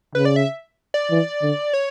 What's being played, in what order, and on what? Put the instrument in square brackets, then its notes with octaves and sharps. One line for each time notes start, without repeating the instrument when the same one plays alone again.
[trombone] C#3 [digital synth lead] B4
[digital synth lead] D5
E5
D5
[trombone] E3
D3
[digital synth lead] C#5